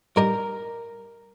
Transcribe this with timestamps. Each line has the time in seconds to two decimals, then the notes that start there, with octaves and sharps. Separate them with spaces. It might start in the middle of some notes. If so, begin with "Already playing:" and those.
0.16 G2 G3 D#4 G4 A#4